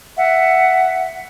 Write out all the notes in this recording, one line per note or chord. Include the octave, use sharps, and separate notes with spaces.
E5 F#5